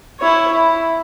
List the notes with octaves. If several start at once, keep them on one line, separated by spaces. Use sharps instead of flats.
E4 C#5
E4